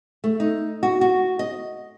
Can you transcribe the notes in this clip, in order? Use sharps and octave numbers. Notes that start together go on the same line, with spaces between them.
A3
D#4
F#4
F#4
D#5